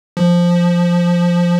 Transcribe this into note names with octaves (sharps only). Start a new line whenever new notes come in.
F3